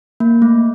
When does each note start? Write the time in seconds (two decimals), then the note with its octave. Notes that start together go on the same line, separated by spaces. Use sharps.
0.20 A#3
0.42 A3